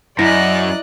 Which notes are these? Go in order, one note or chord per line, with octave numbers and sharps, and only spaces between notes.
F#2 E4 D5 D#5 A#5 F#6